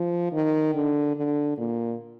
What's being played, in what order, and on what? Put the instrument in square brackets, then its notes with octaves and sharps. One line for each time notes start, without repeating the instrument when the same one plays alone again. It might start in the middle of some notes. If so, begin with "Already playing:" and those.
Already playing: [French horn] F3
D#3
D3
D3
A#2